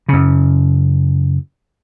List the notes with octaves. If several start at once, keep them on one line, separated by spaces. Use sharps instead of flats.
F#2 C#3